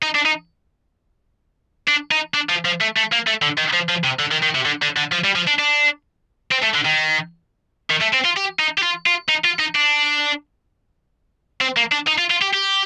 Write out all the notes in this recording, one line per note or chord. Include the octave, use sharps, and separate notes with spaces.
D#4
D4
D#4
D4
D#4
D4
F3
F3
A3
A3
A#3
A3
D3
D#3
F3
F3
C3
D3
D#3
D#3
C3
D3
D3
D3
F3
G3
F3
D4
D4
C4
A3
D3
D#3
D#3
A3
C4
F4
G4
D#4
G4
F4
F4
D#4
F4
D#4
D4
C4
A#3
D4
D#4
F4
F4
G4
G4